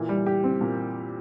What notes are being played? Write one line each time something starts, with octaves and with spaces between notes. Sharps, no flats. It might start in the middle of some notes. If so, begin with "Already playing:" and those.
Already playing: A#2 E3
G3
G4
C4
A#2